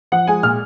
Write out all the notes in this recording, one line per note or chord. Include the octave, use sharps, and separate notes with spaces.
F3 F#5
G#3 G#5
A#2 F6